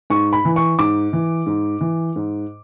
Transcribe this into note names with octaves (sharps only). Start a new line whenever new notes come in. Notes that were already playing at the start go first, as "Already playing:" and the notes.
G#2 C#6
B5
E3
C#6
G#2 D6
E3
G#2
E3
G#2